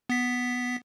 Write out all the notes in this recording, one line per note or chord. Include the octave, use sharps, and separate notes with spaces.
B3 B6